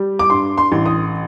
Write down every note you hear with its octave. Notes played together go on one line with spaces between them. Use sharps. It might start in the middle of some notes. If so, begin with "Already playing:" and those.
Already playing: G3
D6
G2 C6
C6
A1
D#6